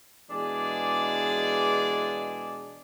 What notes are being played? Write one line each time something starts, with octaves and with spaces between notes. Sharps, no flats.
B2 E3 G#3 D4 G#4 D5